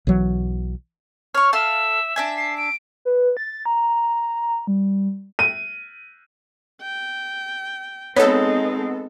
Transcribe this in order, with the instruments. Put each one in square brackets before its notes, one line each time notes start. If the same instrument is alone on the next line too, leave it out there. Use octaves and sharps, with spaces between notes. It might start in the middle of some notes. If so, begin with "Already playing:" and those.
[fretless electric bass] B1 E3 F#3
[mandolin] C#5 C#6 [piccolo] F6
[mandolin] A4 F5 [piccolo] E5
[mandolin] D4 E5 G#5
[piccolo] C7
D7
[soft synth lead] B4
A6
A#5
G3
[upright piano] D#7
[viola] G5
[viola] G#3 D#4 [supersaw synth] B3 A4 [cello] C4 [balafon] C#5